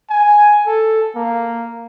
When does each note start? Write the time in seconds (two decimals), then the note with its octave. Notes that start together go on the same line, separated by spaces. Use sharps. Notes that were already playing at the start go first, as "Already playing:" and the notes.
0.10 G#5
0.67 A4
1.16 A#3